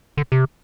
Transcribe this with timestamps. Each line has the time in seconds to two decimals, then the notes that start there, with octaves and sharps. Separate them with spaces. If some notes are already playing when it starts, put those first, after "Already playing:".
0.17 D3
0.32 C3